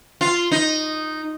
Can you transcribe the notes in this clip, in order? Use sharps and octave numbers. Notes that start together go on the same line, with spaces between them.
F4
D#4